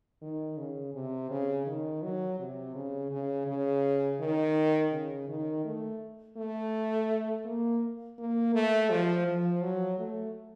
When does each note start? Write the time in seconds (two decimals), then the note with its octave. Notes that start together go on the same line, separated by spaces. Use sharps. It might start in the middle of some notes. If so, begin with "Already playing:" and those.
0.22 D#3
0.58 C#3
0.94 C3
1.30 C#3
1.67 D#3
2.03 F#3
2.39 C3
2.76 C#3
3.11 C#3
3.47 C#3
4.20 D#3
4.92 C#3
5.28 D#3
5.65 A3
6.37 A3
7.45 A#3
8.18 A#3
8.55 A3
8.90 F3
9.27 F3
9.62 F#3
9.99 A3